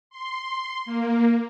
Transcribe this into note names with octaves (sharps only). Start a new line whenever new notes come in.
C6
A#3